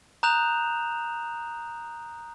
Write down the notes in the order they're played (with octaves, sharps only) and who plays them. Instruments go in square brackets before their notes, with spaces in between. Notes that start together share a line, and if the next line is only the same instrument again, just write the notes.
[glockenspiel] A#5 D#6 F#6 G6 E7 F7